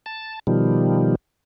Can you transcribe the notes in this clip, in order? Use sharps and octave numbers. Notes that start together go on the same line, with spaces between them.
A5
B2 D#3 F3 G3